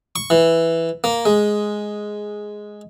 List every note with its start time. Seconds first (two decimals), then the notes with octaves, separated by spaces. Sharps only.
0.16 C#6
0.30 E3
1.04 A#3
1.26 G#3